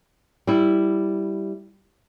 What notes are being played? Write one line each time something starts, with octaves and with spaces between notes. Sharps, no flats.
G3 E4